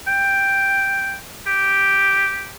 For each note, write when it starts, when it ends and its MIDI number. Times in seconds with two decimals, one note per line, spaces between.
0.07 1.16 79
1.47 2.52 67